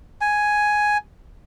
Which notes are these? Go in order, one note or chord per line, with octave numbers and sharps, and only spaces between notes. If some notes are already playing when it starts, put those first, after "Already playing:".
G#5